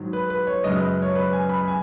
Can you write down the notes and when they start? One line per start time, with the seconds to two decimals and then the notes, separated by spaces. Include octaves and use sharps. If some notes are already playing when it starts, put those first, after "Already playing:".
Already playing: G#2 D#3 F#3
0.13 B4
0.30 B4
0.47 C#5
0.64 F#2 C#3 G#3 D#5
0.77 B4
1.02 C#5
1.15 B4
1.33 G#5
1.49 B5
1.68 G#5